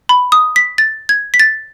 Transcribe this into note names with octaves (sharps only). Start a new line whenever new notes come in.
B5
D#6
B6
A6
G#6
B6
A6